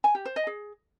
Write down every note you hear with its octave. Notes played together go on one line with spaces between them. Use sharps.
G#5
G4
C5
D#5
G#4